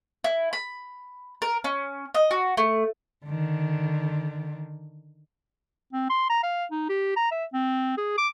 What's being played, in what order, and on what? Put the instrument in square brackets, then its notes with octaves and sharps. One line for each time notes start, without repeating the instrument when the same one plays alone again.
[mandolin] E4
B5
A#4
C#4
D#5
F#4
A3
[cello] D3 D#3
[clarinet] C4
C6
A#5
F5
D#4
G4
A#5
E5
C4
G#4
D6